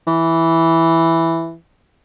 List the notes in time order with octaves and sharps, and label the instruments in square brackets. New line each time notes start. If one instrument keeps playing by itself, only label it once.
[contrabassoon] E3